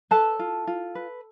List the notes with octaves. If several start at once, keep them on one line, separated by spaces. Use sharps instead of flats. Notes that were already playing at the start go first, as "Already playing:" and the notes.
A4 B4 A5
F4
F4
B4